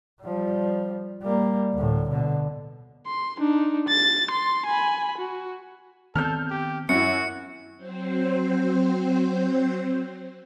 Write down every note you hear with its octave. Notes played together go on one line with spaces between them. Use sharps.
F3 G3
G3 A#3
D2 A2
B2 D3
C6
D4 D#4
A6
C6
G#5 B5
F#4
D#3 B3 C4 A4 F6 G6
G4
F#2 E4 F#4 C#7
F#3 C4 C5